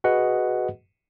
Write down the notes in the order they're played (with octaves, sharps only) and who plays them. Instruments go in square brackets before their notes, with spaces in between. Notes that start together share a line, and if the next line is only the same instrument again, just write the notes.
[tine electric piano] F#4 G#4 B4 D#5 F#5